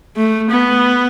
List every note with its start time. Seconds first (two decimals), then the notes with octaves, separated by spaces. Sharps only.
0.17 A3
0.51 B3